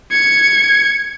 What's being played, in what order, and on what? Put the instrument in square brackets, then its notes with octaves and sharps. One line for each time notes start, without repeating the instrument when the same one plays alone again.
[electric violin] G#6 C#7